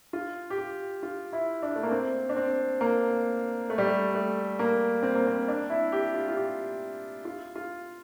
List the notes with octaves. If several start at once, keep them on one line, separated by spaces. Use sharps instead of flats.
F4
G4
F4
F4
E4
D4
A3
A#3
C4
D4
C4
A#3
A3
G3
A3
A3
A#3
C4
A#3
C4
D4
E4
G4
F4
F4
G4
F4
F4